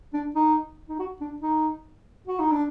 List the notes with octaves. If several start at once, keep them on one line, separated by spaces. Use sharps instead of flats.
D4
D#4
D#4
F#4
D4
D#4
F#4
D#4
D4